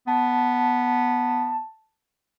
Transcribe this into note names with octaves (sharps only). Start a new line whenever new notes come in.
B3 A5